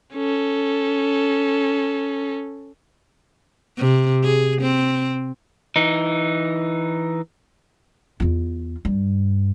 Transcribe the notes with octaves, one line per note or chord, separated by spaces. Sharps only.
C#4 A4
C3
G#4
C4
E3 D#4
E2 F4
G2